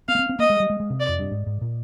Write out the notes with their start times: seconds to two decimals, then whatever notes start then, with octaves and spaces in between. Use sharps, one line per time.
0.08 C4 F5
0.15 A#3
0.19 C4
0.29 C4
0.39 A#3 D#5
0.50 G#3
0.60 G3
0.70 G#3
0.80 G#3
0.90 C3
1.00 D5
1.08 F2
1.19 G2
1.31 G#2
1.46 G#2
1.61 A#2